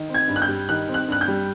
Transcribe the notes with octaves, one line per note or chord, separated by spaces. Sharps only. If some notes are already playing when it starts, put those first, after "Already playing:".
Already playing: D#3
C4
G#6
G2
F#6
G6
G3
D#3 F#6
C4
F#6
G2 F#6
G6
G3